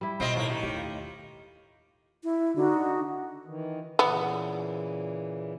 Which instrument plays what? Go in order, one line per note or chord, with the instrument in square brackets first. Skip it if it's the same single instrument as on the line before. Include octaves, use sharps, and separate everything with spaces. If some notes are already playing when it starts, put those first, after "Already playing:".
[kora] G3 E4
[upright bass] B2 [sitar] C4 F4 D#5
[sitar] D#2 A#3 [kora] A2 D4 C#5
[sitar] D#3 [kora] G4 C#5 D#5
[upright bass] D#2 [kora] G4
[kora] F4
[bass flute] E4
[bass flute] D3 [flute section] D#4 F#4
[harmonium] D#3 E3
[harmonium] A#2 C#3 E3 [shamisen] B3